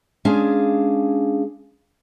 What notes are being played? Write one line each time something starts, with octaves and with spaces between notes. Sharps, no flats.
G#3 C#4 D4 G#4 F5